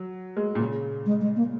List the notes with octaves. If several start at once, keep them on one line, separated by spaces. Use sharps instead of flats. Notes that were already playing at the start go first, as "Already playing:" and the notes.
Already playing: F#3
G#3
A#2
C#3
G#3
G#3
A#3